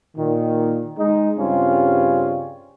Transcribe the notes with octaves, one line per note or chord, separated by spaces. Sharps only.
A#2 D#3
G#3 D#4
G2 C#3 G3 C4 C#4 F4